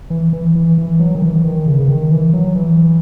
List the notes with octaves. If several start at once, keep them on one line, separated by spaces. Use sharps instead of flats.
E3
E3
E3
E3
F#3
D#3
E3
D#3
C#3
C#3
D#3
E3
F#3
E3